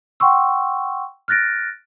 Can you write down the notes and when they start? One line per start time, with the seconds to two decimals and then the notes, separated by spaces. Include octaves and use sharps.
0.20 F#5 G5 C6 C#6 E6
1.28 F6 F#6 A6 A#6 D7